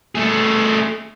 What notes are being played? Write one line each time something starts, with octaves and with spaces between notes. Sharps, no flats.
A3 G#4